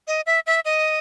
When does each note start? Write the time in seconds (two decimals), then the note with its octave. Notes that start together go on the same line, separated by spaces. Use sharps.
0.07 D#5
0.26 E5
0.47 E5
0.65 D#5